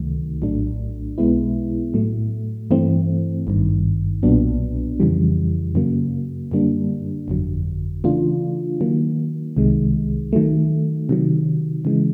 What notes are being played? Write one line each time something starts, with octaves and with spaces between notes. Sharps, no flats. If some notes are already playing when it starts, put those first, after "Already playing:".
Already playing: C#2 C3 D#3 F#3 A3
A#1 A2 F#3 A3 D4
B1 B2 G#3 B3 E4
A2 F#3 A3
G2 E3 A3 C4
G#1 G2 D#3
B1 A#2 F#3 B3 D4
F2 C#3 E3 G3
F#2 C#3 F#3 A#3
F#2 D3 G3 A#3 D4
G1 F2 D3 F#3
C#3 E3 A3 D4 F4
D#3 F#3 A#3
C2 C3 D#3 G#3
D#3 F#3 A3
C3 D#3 F#3
C#3 E3 G#3